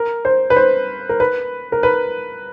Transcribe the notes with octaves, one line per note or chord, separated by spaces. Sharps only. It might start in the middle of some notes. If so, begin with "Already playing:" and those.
Already playing: A#4
C5
B4
C5
A#4
B4
A#4
B4